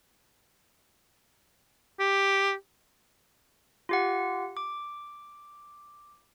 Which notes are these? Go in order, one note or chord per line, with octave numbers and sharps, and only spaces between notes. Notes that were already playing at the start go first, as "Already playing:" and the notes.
G4
F4 G4 F#5
D6